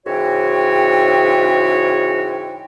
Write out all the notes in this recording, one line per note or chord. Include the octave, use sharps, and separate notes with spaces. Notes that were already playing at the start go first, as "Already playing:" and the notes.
G#2 C#3 E3 F#4 C#5 G5